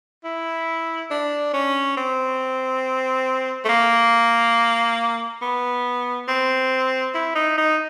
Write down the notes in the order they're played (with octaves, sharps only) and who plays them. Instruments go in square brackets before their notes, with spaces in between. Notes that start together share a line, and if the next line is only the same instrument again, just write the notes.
[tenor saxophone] E4
D4
C#4
C4
A3
A#3
B3
C4
E4
D#4
D#4